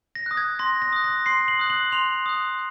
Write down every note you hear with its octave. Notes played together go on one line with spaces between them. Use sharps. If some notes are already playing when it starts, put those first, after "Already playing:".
A#6
D#6 F#6
G#6
C6 A#6
A#6
D#6 F#6
A#6
C6 C7
F#7
D#6 F#6
F#7
C6 F7
D#6 F#6